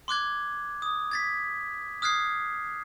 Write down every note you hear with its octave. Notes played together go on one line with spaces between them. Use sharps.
C6 D6 F#6 G#6
D#6
G#6 A6 B6
D#6 F6 F#6 G#6 C7